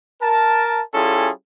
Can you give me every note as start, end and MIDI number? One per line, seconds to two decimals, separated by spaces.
0.22 0.81 70
0.22 0.81 81
0.94 1.30 55
0.94 1.30 61
0.94 1.30 64
0.94 1.30 65
0.94 1.30 68
0.94 1.30 69